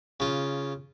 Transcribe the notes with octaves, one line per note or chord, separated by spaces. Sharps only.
C#3 F4